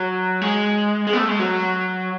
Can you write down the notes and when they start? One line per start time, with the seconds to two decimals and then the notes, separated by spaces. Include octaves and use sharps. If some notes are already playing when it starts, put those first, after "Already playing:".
Already playing: F#3
0.41 G#3
1.07 G#3
1.13 B3
1.18 A3
1.28 G#3
1.39 F#3